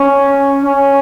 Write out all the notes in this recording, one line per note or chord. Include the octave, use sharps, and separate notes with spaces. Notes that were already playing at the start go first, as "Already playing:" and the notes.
Already playing: C#4
C#4